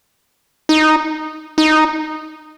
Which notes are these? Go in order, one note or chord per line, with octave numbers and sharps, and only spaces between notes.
D#4
D#4